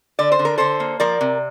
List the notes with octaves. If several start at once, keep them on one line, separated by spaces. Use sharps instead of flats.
D3 D5
C5
D3
A#4
D3 A4 C5
A#3
F3 A#4 D5
C3